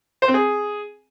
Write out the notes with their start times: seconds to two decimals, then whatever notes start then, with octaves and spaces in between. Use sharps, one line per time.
0.22 C5
0.28 C4
0.34 G#4